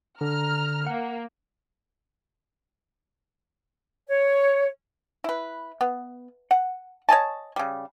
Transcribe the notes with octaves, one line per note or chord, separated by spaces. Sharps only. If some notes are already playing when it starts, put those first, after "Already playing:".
D3 A#5 F6
A#3 F#5
C#5
E4 B4
B3
F#5
C#5 D#5 G#5 A5
C#3 G3